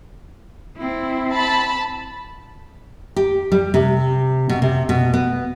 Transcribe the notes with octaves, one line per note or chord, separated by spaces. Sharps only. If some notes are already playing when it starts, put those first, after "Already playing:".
C4 E4
A5 B5
G4
G3
C3
B2
C3
B2
B3